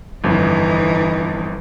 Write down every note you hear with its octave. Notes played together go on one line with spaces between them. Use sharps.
G1 F2 E3 D#4